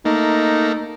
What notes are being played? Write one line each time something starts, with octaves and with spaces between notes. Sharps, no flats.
A3 A#3 D#4